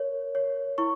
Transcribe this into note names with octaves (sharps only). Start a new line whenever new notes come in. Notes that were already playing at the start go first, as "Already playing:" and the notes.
Already playing: A#4 C#5
C#5
E4 C#6